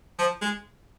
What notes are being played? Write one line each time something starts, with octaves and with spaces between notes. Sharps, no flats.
F3
G#3